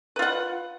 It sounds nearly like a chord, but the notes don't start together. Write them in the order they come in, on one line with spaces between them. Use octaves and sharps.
B4 F4 F#5